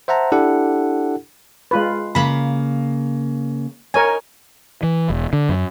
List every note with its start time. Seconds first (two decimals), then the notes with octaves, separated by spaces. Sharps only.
0.08 C5 E5 F#5 A5 A#5
0.32 D4 E4 G4 A4 F#5
1.71 G#3 F4 B4
2.15 C#3 A#3 B5
3.94 D#4 A#4 C#5 G#5
4.83 E3
5.10 E1
5.33 D3
5.49 F#2